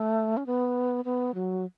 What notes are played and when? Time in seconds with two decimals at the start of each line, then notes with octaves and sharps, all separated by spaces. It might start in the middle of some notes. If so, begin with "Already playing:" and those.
Already playing: A3
0.37 C#4
0.46 B3
1.05 B3
1.34 F#3